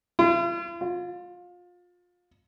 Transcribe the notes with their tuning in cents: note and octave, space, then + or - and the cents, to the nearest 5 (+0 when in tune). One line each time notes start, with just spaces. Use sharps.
F4 -45
F4 +25